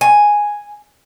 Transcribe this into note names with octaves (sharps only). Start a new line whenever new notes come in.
G#5